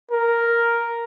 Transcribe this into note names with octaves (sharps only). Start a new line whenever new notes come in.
A#4